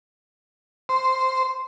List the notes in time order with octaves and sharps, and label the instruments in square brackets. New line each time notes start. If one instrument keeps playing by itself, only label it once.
[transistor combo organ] C5